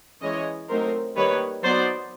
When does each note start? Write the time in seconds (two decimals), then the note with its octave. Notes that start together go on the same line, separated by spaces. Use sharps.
0.21 E3 G#3 C#4 E4 C#5 D#5
0.69 F#3 A3 C4 D#4 A#4 C5
1.16 D#3 G3 A#3 B4 C#5
1.63 F#3 B3 D#4 C5 D5